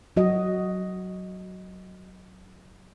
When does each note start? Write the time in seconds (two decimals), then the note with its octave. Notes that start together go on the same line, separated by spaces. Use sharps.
0.16 F#3 F#4 D#5